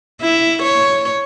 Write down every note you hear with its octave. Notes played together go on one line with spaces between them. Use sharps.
E4
C#5